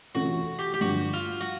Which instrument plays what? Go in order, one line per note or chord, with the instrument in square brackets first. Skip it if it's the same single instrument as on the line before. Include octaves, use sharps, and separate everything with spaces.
[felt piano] C3 E3 A3 C#4 F4 [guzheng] F#4
[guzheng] G4
G4
[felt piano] G2 D3 F3 [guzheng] F#4
[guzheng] F4
F#4